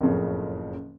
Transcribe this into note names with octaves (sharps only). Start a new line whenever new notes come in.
F#1 F2 A2 C#3 F3